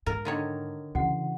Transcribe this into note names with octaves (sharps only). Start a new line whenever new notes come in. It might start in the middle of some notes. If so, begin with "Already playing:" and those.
G#2 A#4
D3 D#3 C#5
C#3 E3 F#4 F#5